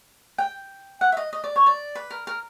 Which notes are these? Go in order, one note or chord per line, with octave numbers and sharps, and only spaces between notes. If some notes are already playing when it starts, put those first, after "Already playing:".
G5
F#5
E5
D#5
D#5
D5
C#5
D5
B4
A#4
A#4